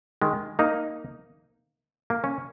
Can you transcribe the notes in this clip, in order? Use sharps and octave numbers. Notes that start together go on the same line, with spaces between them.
D#3 G#3
A#3 D#4
A#3
C#4